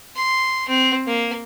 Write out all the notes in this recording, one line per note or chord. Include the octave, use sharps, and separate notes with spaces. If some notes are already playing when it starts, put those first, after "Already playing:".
C6
C4
A#3